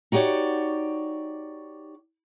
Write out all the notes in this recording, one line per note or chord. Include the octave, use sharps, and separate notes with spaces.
D#4 F#4 G4 C#5 D5